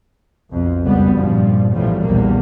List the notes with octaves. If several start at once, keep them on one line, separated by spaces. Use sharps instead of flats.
B1 F2
F#1 C#2 G3 B3
G2 A#2 F3 G3
B1 E2 A2 F3 G3
B1 E2 A#2 G3 A#3